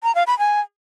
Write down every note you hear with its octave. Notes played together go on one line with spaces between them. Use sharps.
A#5
F5
B5
G#5